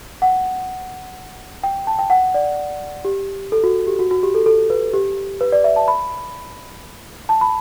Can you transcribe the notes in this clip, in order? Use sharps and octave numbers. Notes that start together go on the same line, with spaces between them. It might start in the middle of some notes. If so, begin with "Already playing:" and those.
F#5
G5
A5
G5
F#5
D5
G4
A4
F#4
G4
F#4
F#4
G4
A4
A4
B4
G4
B4
D5
E5
A5
B5
A5
B5